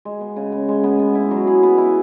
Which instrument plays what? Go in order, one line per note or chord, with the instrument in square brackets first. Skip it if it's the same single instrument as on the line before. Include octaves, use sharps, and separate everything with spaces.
[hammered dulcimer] G#3
B3
C#3
C#3
G#3
B3
B3
E4
F#3
G#4
B3
E4